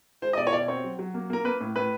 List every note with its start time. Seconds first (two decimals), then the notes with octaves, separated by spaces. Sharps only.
0.22 G#3 C5
0.33 D#5
0.37 B2 D5
0.47 C#5
0.53 B2 D5
0.68 C4 C#5
0.84 F#3
0.99 F#3
1.14 A#3
1.30 A#3 A#4
1.45 A#3 B4
1.61 A2
1.76 A2 B4